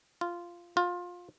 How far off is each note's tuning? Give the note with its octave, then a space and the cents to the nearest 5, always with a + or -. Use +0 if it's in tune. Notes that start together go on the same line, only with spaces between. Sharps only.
F4 -10
F4 +20